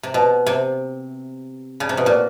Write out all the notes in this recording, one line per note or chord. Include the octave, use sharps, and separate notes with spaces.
C3
B2
C3
C#3
C3
B2
A#2